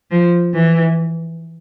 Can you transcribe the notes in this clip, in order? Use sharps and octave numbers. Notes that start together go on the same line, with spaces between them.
F3
E3